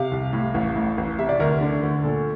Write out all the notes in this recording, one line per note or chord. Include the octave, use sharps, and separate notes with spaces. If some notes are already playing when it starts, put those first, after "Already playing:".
Already playing: C3 F5
C2
A2
A1
A2
A1
C3 E5
D5
D2 A#4
D3
D2
A#2 A4